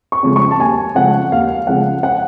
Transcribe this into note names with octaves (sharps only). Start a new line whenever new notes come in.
C#6
C#3 F3 G#3
C#6
A5
D#2 G#5
C#3 F3 G#3 F#5
D#2 F5
C#3 F3 G#3 F#5
F#5